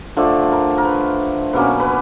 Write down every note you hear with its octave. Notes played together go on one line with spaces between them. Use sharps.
D3 F3 A3 D5
A#4
A#4
B4
B2 F#3 A#3 C#4 B4
B4